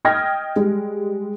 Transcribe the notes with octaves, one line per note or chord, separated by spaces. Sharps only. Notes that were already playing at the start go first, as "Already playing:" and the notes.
D#5 G5 D#6 F6 G#6 A#6
G3 G#3